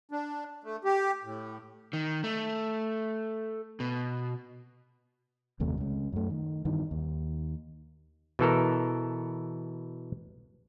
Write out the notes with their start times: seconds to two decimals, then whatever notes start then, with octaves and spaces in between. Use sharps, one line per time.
0.11 D4
0.64 A3
0.84 G4
1.24 A2
1.93 D#3
2.24 A3
3.80 B2
5.60 F#1 D#2 C3 A3
5.78 C#2 C#3
6.12 F#2 A3
6.30 D#3
6.65 G2 D#3 E3
6.91 D#2
8.39 B2 E3 A4 A#4